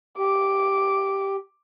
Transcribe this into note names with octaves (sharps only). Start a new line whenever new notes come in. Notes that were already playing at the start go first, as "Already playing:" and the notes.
G4 D6